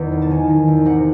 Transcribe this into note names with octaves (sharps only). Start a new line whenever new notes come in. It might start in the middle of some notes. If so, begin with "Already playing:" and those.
Already playing: E2 D#3
C3
A5
D#3 G#5
D#3
E2
C3 F#5